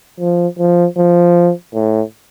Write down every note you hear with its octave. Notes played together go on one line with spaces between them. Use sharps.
F3
F3
F3
A2